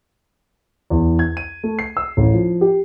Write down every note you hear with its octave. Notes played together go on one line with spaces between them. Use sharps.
E2
G#6
D#7
A3
C7
E6
A1
F3
G4